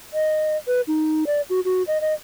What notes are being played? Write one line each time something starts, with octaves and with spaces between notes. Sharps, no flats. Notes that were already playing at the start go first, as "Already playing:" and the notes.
D#5
B4
D#4
D5
F#4
F#4
D#5
D#5